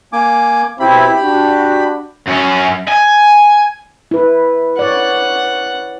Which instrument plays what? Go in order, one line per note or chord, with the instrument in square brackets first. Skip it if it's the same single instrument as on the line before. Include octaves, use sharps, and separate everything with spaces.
[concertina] A#3 G#5 D6
[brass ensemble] B2 C4 E4 [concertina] G4 B5
[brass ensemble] D4 F#4
[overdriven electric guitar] F#2 C#4
G#5
[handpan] E4 B4
[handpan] C#5 D5 [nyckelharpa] F#5